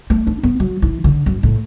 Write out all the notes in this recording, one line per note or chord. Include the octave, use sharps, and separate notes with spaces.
A3
D4
B3
F#3
E3
D3
F#2
A2